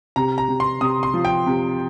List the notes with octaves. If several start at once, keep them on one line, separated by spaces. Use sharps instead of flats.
C3 A#5
A#5
C3
C6
C3 D#6
C6
F3
G5
C3